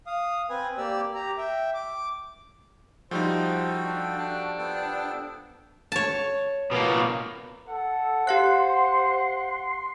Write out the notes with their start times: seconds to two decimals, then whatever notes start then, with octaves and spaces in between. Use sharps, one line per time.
0.07 F5 D#6
0.50 C4 B4 G#5
0.78 A#3 G4 D5 E6
1.15 G4 A#5
1.38 E5 G5
1.74 D6
3.11 F3 G3 D#4 F#4 A4 C5 G5
3.84 D4
4.18 D4
4.59 B3 A4 G5
5.92 C#5 A5
6.72 B2 A#3
7.68 A4 F#5
8.27 G4 C5 F5 C6 F#6